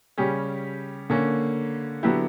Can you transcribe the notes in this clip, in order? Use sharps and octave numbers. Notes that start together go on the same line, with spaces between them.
C#3 G3 C#4 G4
D3 A#3 C#4
D3 F#3 B3 E4 G4